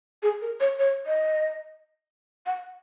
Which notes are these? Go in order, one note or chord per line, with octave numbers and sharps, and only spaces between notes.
G#4
A#4
C#5
C#5
D#5
F#5